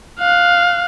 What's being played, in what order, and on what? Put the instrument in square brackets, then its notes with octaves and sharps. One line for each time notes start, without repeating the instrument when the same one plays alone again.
[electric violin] F5 F#6